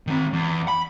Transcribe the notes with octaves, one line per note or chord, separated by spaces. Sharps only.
D#3 C4
E2
B5